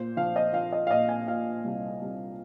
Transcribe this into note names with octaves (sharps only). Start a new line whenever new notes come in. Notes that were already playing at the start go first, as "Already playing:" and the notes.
Already playing: A#2 C5
F3 F5
D#5
F3 F5
D#5
F5
A#2 D#5
G#5
A#2 F5
C2
C2